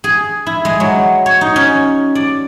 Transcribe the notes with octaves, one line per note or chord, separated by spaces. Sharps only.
G#4
E4
G#3
F#3
C#5
D#4
C#4
D5